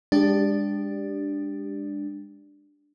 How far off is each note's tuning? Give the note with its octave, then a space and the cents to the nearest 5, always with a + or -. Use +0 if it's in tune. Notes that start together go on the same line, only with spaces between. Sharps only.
G#3 -30 D4 +0 G4 +0